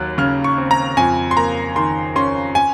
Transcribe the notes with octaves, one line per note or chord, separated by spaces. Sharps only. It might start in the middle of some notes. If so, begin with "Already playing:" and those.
Already playing: D#2 F#3 F#6
C#3 F6
C#6
C4
A#5
F2 G#5
C6
A#3 A#5
D#3 C6
C#4 C6
G#5